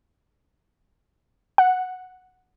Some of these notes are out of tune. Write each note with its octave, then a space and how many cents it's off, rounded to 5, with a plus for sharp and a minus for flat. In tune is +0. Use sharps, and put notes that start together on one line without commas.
F#5 -5